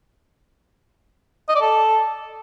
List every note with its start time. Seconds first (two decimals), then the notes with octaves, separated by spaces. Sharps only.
1.49 D#5
1.55 D5
1.62 A4